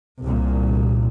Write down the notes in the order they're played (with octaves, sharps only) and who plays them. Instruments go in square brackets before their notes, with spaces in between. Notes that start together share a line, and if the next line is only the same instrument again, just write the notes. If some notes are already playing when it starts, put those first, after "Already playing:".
[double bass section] C2 A#2